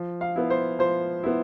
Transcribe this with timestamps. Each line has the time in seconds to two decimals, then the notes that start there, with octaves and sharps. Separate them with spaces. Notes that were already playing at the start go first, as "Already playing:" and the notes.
Already playing: F3
0.21 F5
0.36 B3 E4
0.50 C5
0.79 F3 C5
1.23 B3 E4